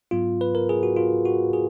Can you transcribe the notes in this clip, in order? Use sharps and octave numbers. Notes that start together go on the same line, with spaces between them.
G#2 F#3 B3 F4
B4
A#4
G#4
F#4
F4
F#4
G#4